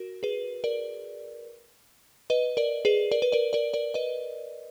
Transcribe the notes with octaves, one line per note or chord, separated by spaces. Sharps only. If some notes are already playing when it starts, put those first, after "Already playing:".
Already playing: F#4 A#4
G#4 B4
A#4 D5
B4 D#5
A#4 D5
G#4 B4
A#4 D5
B4
A#4 D5
A#4 D5
A#4 D5
B4 D#5